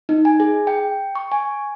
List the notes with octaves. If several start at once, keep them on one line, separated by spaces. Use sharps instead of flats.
D#4
G#5
G#4
G5
C#6
G#5